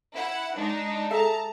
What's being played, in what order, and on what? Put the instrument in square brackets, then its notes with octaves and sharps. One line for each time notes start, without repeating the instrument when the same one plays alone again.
[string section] E4 F#5
G#3 D4 D#4
[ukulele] G#4 A4 E5 [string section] A5 A#5